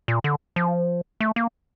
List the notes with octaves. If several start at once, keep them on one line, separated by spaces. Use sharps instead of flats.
A#2
D3
F3
A3
A#3